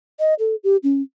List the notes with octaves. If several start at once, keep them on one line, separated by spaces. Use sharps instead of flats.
D#5
A4
G4
C#4